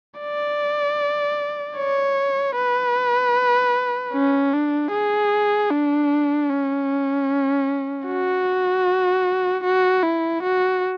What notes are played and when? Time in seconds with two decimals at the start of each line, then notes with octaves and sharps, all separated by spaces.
0.20 D5
1.78 C#5
2.56 B4
4.13 C#4
4.53 D4
4.92 G#4
5.71 D4
6.49 C#4
8.08 F#4
9.64 F#4
10.03 E4
10.43 F#4